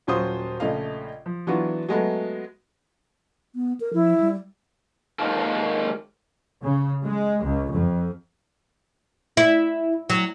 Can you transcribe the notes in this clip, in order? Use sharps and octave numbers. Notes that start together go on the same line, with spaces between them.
D#1 F#3 C#4 F4 C5 D#6
A#1 C#3 A3 D#5 F5
F3
E3 F#3 B3 D4 F4 F#4
F#3 G#3 A3 B3
B3
A#4
F3 E4
G3
D#3 G#3 A#3 D#4 F4 A4
C#3
G#3
C#2
F2
E4
F#3